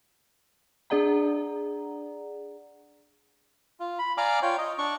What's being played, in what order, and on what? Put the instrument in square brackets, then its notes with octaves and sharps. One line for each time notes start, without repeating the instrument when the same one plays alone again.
[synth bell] D4 G#4 D5 F#5 A#5
[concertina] F4
B5
D5 F5 G#5 A#5 D6
F4 C#5 G5
D#5
D4 C#6